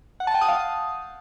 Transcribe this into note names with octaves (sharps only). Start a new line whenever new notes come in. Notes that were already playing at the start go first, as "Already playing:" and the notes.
F#5
A5
G5
D#6
F5